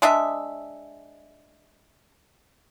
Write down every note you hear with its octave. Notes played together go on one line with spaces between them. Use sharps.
G#3 D4 D#5 E5